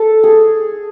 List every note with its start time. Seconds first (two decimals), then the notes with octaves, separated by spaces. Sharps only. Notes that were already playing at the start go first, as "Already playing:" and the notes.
Already playing: A4
0.23 G#4